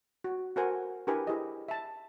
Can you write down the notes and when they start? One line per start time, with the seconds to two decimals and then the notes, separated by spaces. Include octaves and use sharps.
0.24 F#4
0.56 F#4 A4 A#4 C5 F#5 G#5
1.07 D4 E4 G4 A#4 B4 G#5
1.27 E4 G4 G#4 C5 D#5
1.68 E5 A5